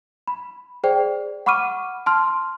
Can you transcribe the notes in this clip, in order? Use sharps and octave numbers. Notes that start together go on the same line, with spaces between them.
B5
G#4 C5 D5 G5
F#5 B5 C#6 D6 F6 D#7
A5 C6 F6